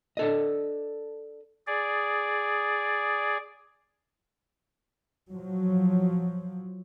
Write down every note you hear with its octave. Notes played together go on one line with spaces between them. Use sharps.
D4 A4 D#5
G#4 D5
F3 F#3